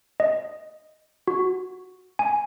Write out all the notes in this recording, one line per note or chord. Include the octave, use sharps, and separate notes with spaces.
D#5
F#4
G#5